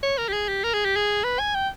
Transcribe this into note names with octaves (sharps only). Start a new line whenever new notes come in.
C#5
A#4
G4
G#4
G4
A#4
G#4
G4
G#4
B4
G#5
G5